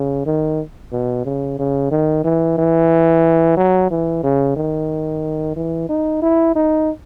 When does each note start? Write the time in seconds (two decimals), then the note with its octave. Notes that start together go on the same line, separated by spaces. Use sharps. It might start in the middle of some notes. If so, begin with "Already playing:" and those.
Already playing: C#3
0.26 D#3
0.92 B2
1.25 C#3
1.59 C#3
1.91 D#3
2.25 E3
2.58 E3
3.57 F#3
3.91 E3
4.24 C#3
4.57 D#3
5.56 E3
5.89 D#4
6.22 E4
6.56 D#4